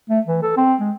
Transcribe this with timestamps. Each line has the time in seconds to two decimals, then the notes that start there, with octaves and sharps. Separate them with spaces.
0.10 A3
0.26 E3
0.43 A4
0.57 C4
0.80 G#3